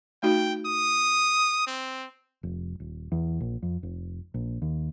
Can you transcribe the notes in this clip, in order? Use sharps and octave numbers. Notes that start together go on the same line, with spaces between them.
A3 D#4 F#4 G5
D#6
C4
F1
D#1
E2
A#1
F2
F1
A#1
D#2